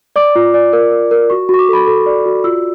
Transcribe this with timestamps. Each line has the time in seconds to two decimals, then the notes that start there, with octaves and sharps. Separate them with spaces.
0.16 D5 D6
0.36 F4
0.54 D5
0.73 A#4
0.92 A#4
1.11 A#4
1.30 F#4 C#6
1.49 F#4 C#6
1.59 D6
1.69 A4 B5
1.87 A4
2.06 D5
2.26 F#4
2.44 F4 E6